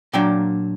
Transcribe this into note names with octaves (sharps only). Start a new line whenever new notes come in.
A#2 F#3 A#3 D4 G5